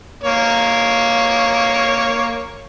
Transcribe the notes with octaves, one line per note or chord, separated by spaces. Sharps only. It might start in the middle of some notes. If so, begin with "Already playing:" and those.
A#3 C#5